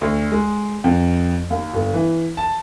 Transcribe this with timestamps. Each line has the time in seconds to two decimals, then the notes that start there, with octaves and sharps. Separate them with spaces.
0.01 D2
0.32 G#3
0.84 F2
1.50 D#2
1.74 G1
1.94 E3
2.37 A5